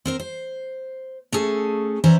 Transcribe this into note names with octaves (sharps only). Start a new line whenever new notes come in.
C4 A#4 C5
C5
A3 C#4 G#4 A4
E3 C#4 C5 D5 E5 A#5